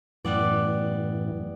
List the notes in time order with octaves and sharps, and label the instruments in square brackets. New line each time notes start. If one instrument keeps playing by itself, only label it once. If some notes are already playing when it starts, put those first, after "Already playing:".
[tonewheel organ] F#2 A2 E3 [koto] G3 B3 D5